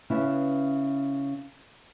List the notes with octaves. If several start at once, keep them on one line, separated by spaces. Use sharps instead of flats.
C#3 B3 C#4 E4